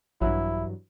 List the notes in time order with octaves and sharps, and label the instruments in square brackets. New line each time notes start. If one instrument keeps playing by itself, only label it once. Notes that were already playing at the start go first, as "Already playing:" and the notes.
[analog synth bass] A#1 [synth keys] G2 E3 F#3 [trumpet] E4